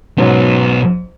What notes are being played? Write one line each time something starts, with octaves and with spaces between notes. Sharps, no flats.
B1 G#2 F#3 B3 C#4